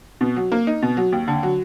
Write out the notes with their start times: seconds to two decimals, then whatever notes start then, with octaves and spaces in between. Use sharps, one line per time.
0.21 B2
0.37 F#3
0.52 A#3
0.67 D#4
0.82 B2
0.97 F#3
1.12 D#2
1.28 D3
1.43 F#3